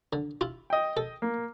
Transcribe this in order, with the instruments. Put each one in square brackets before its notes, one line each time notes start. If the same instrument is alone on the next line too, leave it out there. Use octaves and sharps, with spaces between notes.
[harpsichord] D3
E4 F4
[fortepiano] D#5 G5
[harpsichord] A4
[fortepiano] A#3